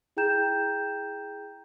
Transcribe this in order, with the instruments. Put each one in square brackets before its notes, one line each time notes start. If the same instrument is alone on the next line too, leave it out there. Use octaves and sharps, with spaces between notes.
[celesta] E4 G#4 G5 A#5 G6 E7